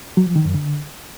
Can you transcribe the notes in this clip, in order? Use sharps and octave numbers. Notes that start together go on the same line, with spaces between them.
F#3
F3
D#3
F#2
D3